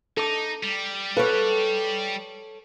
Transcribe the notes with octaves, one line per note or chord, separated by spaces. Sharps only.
D#4 A4 D6
G3
A4 B4 C#5 F5